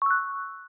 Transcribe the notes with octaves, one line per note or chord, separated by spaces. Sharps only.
C#6 E6 F#6